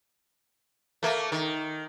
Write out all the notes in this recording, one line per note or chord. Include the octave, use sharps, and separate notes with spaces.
A3 A#3
D#3